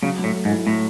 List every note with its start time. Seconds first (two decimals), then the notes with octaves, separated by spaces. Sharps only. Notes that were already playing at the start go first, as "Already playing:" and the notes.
0.02 C#3 F#3
0.19 A2 F#3
0.34 A3
0.45 G#2
0.51 E4
0.67 A2 F#3